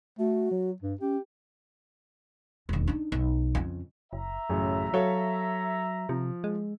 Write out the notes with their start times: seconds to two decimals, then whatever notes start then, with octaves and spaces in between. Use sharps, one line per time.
0.19 A3 F#4
0.51 F#3
0.82 G2
1.01 C#4 G4
2.69 E1 D#2
2.87 D4 D#4
3.12 B1
3.55 F2 C#3
4.13 F#1 E5 A#5
4.50 A1 F#2 C#3 F#3
4.94 F#3 A4 C#5 F5
6.09 C3 F3
6.44 G#3